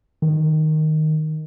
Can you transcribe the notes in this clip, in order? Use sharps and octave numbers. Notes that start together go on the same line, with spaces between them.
D#3